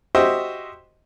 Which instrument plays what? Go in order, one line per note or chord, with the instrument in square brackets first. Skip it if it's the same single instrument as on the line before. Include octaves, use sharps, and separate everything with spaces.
[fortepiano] F#4 G4 C5 D#5 E5